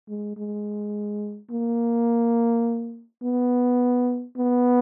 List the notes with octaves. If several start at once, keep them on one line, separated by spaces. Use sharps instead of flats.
G#3
G#3
A#3
B3
B3